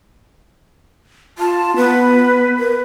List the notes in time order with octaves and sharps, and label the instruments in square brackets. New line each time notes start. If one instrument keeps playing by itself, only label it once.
[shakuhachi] F4 [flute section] A5
[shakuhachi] B3 [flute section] B4
[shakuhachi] A#4